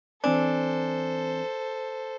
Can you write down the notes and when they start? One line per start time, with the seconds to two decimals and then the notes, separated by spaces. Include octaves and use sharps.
0.24 E3 C4 D4 A4 C5 G#5